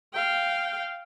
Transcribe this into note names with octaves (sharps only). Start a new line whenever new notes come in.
F5 G5